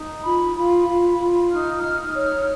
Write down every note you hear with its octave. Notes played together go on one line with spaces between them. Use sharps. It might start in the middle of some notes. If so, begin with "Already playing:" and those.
Already playing: D#4
F4 B5
F4 B5
F4
F4
D#4 F6
D#4
C#5 F6